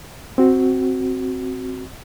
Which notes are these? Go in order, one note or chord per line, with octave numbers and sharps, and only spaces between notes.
C4 F#4